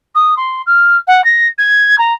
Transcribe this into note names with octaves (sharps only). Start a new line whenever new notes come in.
D#6
C6
F6
F#5
A#6
G#6
A#5